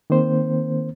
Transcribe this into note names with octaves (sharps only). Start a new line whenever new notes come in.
D#3 A#3 C4 C5